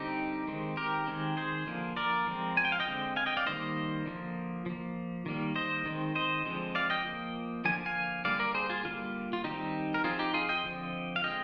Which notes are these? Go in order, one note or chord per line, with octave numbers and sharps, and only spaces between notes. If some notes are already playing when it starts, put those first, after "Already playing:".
Already playing: D3 G3 C4 D#4 G4
D#3 G#3 C4
G4 A#4
D#3 G#3 C4
G#4 C5
D3 F3 A#3
A#4 D5
F3 G#3 C4
G#5
G5
F5
D#5 G5
D3 G#3 C4
F5 G#5
D#5 G5
D5 F5
D#3 G3 A#3 C5 D#5
D3 F3 A#3
F3 A#3
D#3 G3 A#3
C5 D#5
D#3 G#3 C4
C5 D#5
D3 F3 G#3 C4
D5 F5
D#5 G5
F3 A#3
D3 F3 A#3 G#5
F5 G#5
D3 G3 A#3 D5 F5
A#4 D5
G#4 C5
F4 G#4
D3 G3 A#3 F4
F4
D#3 G3 C4 D#4 G4
A#4
F3 C4 F4 G#4
D#4 G4
F4 G#4
D#5 G5
D3 F3 C4
F5
D3 G#3 C4 D#5 G5